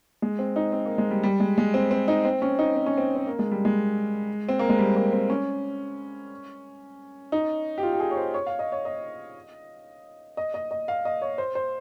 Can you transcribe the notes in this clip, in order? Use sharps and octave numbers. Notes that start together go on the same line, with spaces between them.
G#3
C4
D#4
C4
A#3
G#3
G3
G3
G#3
G#3
C4
C4
D#4
C4
C#4
D#4
C4
C#4
C4
C4
A#3
G#3
G3
G#3
C4
A#3
G#3
G3
A#3
C4
C#4
D#4
G4
F4
G4
G#4
C#5
C5
C#5
F5
D#5
C#5
D#5
D#5
D#5
D#5
F5
D#5
C#5
C5
C5